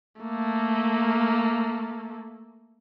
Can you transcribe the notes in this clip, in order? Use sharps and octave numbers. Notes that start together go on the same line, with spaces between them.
A3 A#3